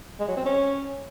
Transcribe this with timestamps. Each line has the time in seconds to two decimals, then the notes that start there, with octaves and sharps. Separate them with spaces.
0.20 G#3
0.28 F#3
0.37 C4
0.45 C#4